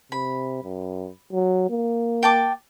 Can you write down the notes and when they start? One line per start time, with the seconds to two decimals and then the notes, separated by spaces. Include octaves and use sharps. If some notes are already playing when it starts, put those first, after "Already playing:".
0.12 C3 B5
0.63 F#2
1.33 F#3
1.70 A#3
2.23 G5 A5 D6